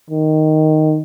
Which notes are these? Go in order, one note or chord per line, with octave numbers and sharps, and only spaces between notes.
D#3